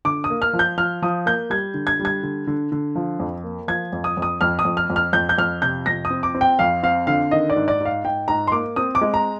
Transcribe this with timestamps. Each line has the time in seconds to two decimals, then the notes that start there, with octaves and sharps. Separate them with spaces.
0.05 D3 D6
0.24 D#6
0.30 A#3
0.42 F6
0.53 F3
0.59 G6
0.77 F3 F6
1.02 F3 D#6
1.26 A#3 G6
1.50 G3 G#6
1.74 D3
1.87 G#6
1.99 G3
2.05 G#6
2.23 D3
2.47 D3
2.72 D3
2.95 F3
3.20 F2
3.44 A#3
3.68 F3 G#6
3.93 F2
4.04 D#6
4.17 F2
4.22 D#6
4.41 F2 F6
4.59 D#6
4.65 F2
4.77 F6
4.90 F2
4.96 F6
5.13 F2 G6
5.29 G6
5.38 F2 F6
5.62 C3 G6
5.86 F2 A#6
6.05 D#6
6.10 C4
6.23 D6
6.35 C4
6.41 G5
6.59 F2 F5
6.83 C4 F5
7.07 D3 F5
7.31 D#3 D#5
7.50 D5
7.56 G#2
7.68 D5
7.81 G#2 F5
8.04 G#2 G5
8.28 G#2 A#5
8.47 C6
8.52 A#3 D6
8.76 C4 D#6
8.95 D6
9.01 G#3
9.14 A#5